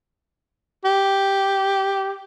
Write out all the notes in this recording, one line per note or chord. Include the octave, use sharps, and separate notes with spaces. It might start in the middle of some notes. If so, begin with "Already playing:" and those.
G4